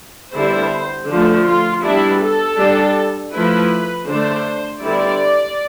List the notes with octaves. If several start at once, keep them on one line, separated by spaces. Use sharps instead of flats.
D3 G3 B3 E4 C5
D3 F3 A3
F4
G3 B3 D4 E4
A4
G3 D4
F3 A3 E4 B4
D3 A3 D4 C5
D3 G3 B3 E4 D5